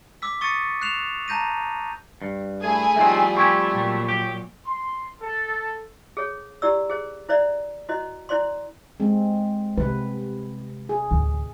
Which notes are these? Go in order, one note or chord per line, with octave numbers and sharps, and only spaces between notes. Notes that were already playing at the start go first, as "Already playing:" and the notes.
D6 E6 B6
C#6 D#6 A6 C#7 D#7
F#6 C7 E7 F7
A5 A#5 G6 A#6 D#7
G2
A3 E4 G#4 G#5
D#2 D#3 F3 G3 A3 C4 E5
C4 E4 G4 C#6 G#6
A#2 F#3
G4
C6
A4
G#4 A4 C#5
E4 G4 D5 E6
G#4 C5
E4 C5 D5 E5
E4 F#4 C5 D#5
E4 C5 D5 C6
G#3 C4
C3 C4 B4
G#4
A1 D2